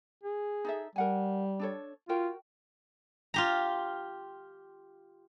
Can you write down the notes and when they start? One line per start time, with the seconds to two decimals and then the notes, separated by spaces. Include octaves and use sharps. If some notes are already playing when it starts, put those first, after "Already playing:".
0.24 G#4
0.65 D#4 A4 E5
0.96 G3 A#4 F#5 G#5
1.60 D4 A4 C#5
2.09 F4 F#4 A#4 G5
3.34 F4 G4 A#5